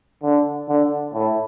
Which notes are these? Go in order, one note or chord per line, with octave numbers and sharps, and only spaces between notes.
D3
D3
A2